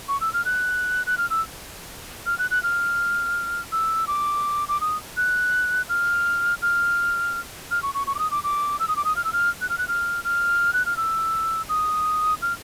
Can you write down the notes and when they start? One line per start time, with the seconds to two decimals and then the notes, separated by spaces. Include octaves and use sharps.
0.08 C#6
0.21 E6
0.33 F6
0.45 F#6
1.07 F#6
1.18 F6
1.30 E6
2.26 F6
2.39 F#6
2.51 F#6
2.63 F6
3.72 E6
4.07 D6
4.68 D6
4.81 D#6
5.17 F#6
5.89 F6
6.62 F6
7.71 F6
7.83 C#6
7.94 C#6
8.07 C#6
8.15 D6
8.19 D#6
8.31 D6
8.44 D6
8.80 E6
8.88 D#6
8.96 D6
9.05 D#6
9.16 F6
9.24 E6
9.33 F6
9.61 F#6
9.69 F6
9.78 F#6
9.88 F6
10.24 F6
10.73 F#6
10.86 F6
10.97 E6
11.69 D#6
12.42 F6